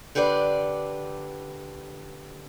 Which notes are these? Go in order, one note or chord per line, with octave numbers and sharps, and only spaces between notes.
D3 G4 B4 C5 D5